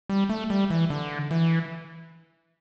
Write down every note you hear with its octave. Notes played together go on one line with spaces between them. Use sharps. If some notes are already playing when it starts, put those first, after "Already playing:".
G3
A3
G3
E3
D3
E3